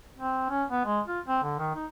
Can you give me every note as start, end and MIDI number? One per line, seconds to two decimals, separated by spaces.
0.18 0.45 60
0.49 0.64 61
0.70 0.84 59
0.85 1.01 56
1.07 1.20 65
1.28 1.39 60
1.43 1.55 50
1.59 1.73 51
1.75 1.86 63